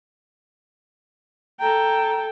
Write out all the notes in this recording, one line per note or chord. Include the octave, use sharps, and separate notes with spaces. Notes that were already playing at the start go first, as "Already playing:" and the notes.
A4 G5 A#5